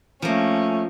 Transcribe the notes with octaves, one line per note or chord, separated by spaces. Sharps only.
F3 A3 A#3 C#4